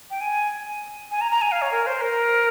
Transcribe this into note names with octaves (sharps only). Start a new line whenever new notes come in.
G5
G#5
G#5
A#5
A#5
G#5
F5
C#5
A#4
C5
A#4